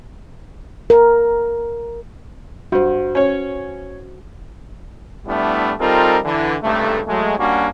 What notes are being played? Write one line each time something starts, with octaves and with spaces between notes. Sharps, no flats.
A#4
G2 F#4 C5
C#4 C#5
G3 A3 B3 D4 E4
G3 C4 D#4 F4 A4 A#4
D3 E3
C#2 G2 C3 A3
F#3 G#3 A3
G3 A#3 C#4 D4 F#4